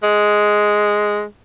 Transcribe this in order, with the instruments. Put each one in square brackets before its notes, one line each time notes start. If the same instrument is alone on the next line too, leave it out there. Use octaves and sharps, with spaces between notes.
[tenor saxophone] G#3